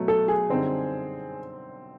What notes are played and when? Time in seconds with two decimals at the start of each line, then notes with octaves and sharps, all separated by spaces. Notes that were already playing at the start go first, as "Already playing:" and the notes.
Already playing: B2 F#3 A3
0.08 A4
0.28 G#4
0.49 F#2 D3 G3 C4 D#4